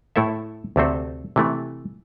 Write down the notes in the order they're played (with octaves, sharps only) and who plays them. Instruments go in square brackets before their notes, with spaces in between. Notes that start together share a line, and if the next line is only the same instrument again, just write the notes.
[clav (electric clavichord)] A2 A3 E4 A4 E5
D2 C3 A3 C4 A4
C3 E3 A3